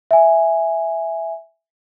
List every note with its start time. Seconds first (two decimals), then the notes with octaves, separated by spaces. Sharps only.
0.11 E5 G#5